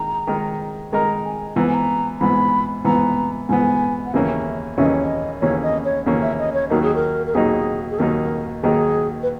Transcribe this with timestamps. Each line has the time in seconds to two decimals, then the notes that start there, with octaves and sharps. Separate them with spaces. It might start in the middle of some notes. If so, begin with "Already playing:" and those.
Already playing: D#3 G#3 D#4 A#4 A#5
0.27 D#3 G#3 D#4 A#4
0.92 D#3 G#3 D#4 A#4 A#5
1.25 G#5
1.56 G#2 E3 B3 A#5
1.66 G#5
1.74 A#5
2.20 G#2 E3 B3 B5
2.85 G#2 E3 B3 A#5
3.49 G#2 E3 B3 G#5
4.06 F#5
4.13 D#2 C#3 E3 A#3 C#4 E5
4.78 D#2 C#3 E3 A#3 C#4 E5
4.86 D#5
4.95 C#5
5.04 D#5
5.41 D#2 C#3 E3 A#3 C#4 C#5
5.63 D#5
5.85 C#5
6.06 D#2 C#3 E3 A#3 C#4
6.22 E5
6.39 D#5
6.54 C#5
6.70 D#2 D#3 F#3 A#3 D#4 A#4
6.83 G#4
6.95 A#4
7.27 A#4
7.34 D#2 D#3 F#3 A#3 D#4 G#4
7.90 G#4
7.99 D#2 D#3 F#3 A#3 D#4 A#4
8.63 D#2 D#3 F#3 A#3 D#4 G#4
9.23 B4